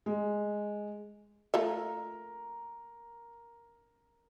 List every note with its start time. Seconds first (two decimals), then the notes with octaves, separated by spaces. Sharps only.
0.06 G#3
1.54 A3 F4 A#4 E5